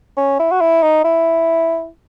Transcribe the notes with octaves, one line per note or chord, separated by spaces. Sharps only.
C#4
E4
F#4
E4
D#4
E4